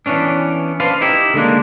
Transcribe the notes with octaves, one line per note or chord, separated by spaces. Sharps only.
E3 B3 C#4 D4
B4 C5 D5 F5 A5
D#4 E4 G4
D3 G#3 A#3 D4